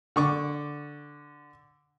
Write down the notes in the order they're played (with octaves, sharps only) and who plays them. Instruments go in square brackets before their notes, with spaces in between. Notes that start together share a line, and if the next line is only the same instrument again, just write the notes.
[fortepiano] D3 C#6 D6